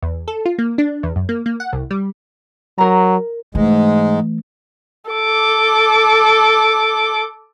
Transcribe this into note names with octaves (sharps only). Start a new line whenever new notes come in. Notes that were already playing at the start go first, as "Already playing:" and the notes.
E2
A4
F4
A#3
D4
E2
F#2
A#3
A#3
F#5
C2
G3
F#3 A#4 A#5
G#2 E3 G#3 A3
A4 D6